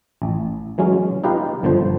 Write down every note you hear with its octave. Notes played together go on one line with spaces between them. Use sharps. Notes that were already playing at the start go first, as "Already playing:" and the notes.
A1
E3 F#3 G#3 C#4
D#4 F4 G4 B4 D#5 F5
G1 D3 F3 C5